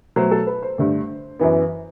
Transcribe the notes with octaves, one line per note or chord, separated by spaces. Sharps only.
B2 F#3 A3 C5
A4
B4
C5
G2 D3 A3
F#2 E3 B3